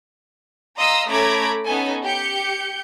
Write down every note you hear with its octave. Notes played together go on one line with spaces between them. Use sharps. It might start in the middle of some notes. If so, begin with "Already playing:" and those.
D#5 F5 A#5 C6 D#6 E6
A3 C#4 A#5 B5 D6 G#6
B3 C#4 D#4 A4 G#5
G4 G6 C#7